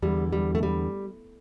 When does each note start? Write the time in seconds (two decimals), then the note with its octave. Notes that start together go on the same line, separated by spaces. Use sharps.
0.02 E2 D3 G3
0.33 G3
0.55 A3
0.63 G3